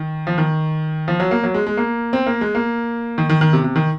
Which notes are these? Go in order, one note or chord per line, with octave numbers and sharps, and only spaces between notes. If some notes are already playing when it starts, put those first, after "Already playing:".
Already playing: D#3
F3
D#3
F3
F#3
A#3
F#3
G#3
G#3
A#3
C4
A#3
G#3
A#3
D#3
D#3
D#3
C3
C3
D#3